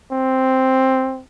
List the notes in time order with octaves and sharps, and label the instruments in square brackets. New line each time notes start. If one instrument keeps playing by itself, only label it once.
[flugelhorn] C4